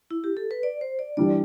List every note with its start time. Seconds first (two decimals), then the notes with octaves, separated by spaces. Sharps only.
0.11 E4
0.24 G4
0.37 A4
0.51 B4
0.63 D5
0.81 C5
0.99 D5
1.17 E3 G3 D4 D5